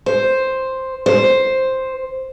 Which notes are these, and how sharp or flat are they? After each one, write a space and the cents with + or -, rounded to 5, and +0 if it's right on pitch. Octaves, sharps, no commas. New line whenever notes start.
C5 +5
C5 +5